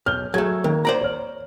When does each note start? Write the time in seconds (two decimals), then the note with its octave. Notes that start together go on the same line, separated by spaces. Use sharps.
0.06 B1 F6 G6 G7
0.34 F#3 A3 G#4 G#6
0.64 D#3 A#3
0.85 C5 D5 A#5
1.01 C#5 F6